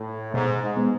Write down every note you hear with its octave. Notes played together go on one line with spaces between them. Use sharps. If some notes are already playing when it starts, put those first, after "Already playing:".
Already playing: A2
G#2 B2
G#2
G#3 B3